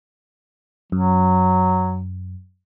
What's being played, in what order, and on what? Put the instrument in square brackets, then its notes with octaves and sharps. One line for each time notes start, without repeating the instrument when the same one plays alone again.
[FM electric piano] F#2 [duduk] F#3